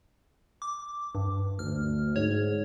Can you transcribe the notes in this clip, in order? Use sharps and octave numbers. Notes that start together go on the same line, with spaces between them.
D6
G2
D2 F6
G#2 C#5